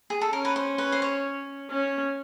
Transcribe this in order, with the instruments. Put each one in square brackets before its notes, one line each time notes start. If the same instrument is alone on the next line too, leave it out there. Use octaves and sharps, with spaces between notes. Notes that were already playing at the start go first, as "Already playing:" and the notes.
[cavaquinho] G#4
A4
[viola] C#4 [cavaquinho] A#4
[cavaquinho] B4
C5
B4
C5
C#5
[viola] C#4